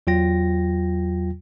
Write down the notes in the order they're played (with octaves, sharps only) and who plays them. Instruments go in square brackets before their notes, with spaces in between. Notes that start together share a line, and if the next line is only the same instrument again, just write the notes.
[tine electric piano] E2 F#3 F4 G5 A#6